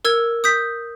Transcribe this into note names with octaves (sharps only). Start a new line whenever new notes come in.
A#4 E6 G#6
D#6 G6 B6